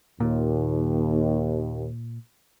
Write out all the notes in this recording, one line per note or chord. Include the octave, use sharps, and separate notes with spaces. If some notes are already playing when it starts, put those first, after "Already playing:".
D#2 A#2